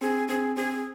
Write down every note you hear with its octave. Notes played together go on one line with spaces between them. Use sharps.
C4 G#4
C4 G#4
C4 G#4